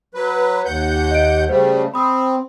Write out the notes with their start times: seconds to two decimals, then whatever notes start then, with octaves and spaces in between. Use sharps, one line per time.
0.15 F#3 B4
0.66 D#2 F#5 G6
1.11 D#5 D7
1.49 C#3 G3 A3 C5
1.94 C4 B5 D#6